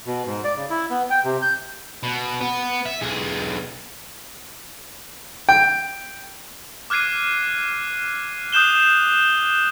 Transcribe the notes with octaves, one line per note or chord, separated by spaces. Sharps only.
B2
G#2
D5
C#3
E4
B3
G5
C3
G6
B2
B3
E5
B1 G#4
G5
D6 F6 F#6 G#6 C7 D#7
D#6 F#6 G6 E7 G7